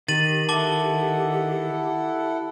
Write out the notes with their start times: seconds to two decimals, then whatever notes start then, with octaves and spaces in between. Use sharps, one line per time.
0.08 D#3 G4 A6 D#7 F#7
0.49 E4 A4 F#5 A5 D6 G7